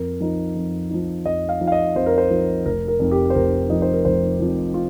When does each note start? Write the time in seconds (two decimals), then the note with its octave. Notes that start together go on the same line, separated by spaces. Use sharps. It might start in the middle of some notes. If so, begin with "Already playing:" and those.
Already playing: F2 A#4
0.20 F3 D#4
0.55 F2
0.90 F3 D#4
1.25 F2 D#5
1.49 F5
1.61 F3 D#4
1.67 F5
1.72 D#5
1.95 F2 C5
2.06 A#4
2.18 C5
2.31 F3 D#4
2.65 F1 A#4
2.88 A#4
3.00 F2 F3 D#4
3.11 G4
3.30 C5
3.35 F1 A#4
3.69 F2 F3 D#4 D#5
3.82 C5
3.93 A#4
4.05 F1 C5
4.40 F2 F3 D#4
4.74 F4